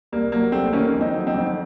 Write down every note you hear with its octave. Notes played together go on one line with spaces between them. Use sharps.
C2 A#3
F#3 A#3
C2 A3 C4
D#3 A#3 C#4
F2
C4 D#4
F#3
C4 D#4
F2